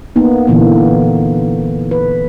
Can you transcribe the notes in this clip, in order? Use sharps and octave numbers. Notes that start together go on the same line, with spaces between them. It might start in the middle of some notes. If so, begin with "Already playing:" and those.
A#3 B3 D#4
A#2 D3 E3 A#3 B3
B4